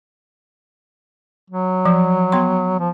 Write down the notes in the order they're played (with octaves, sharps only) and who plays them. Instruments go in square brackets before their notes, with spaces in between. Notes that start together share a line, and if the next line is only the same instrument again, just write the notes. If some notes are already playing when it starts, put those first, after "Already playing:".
[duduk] F#3
[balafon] F3
B3 C6
[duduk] F3